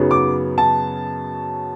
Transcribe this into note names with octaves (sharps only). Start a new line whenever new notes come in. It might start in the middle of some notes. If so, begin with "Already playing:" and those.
Already playing: F#2 C#3 F#3 B3 D#4
D6
A5